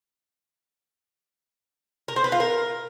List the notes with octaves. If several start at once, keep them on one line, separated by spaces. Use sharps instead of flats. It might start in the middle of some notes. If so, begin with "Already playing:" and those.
A#4
C5
B4
F4
A#4